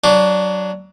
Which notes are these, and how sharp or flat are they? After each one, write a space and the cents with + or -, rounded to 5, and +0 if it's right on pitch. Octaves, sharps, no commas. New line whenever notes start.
F#3 +20 D4 +0